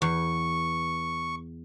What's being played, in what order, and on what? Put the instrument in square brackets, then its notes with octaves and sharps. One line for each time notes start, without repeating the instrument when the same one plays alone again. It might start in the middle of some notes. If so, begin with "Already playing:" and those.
[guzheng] E2 [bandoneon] C#6